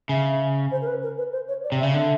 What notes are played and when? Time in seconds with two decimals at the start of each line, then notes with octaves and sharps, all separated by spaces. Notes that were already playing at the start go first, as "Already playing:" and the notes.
0.09 C#3 E5
0.71 C5
0.81 A#4
0.87 B4
1.02 A#4
1.18 B4
1.32 C5
1.48 C#5
1.64 D5
1.72 C3
1.79 E5
1.83 C#3
1.94 D3 E5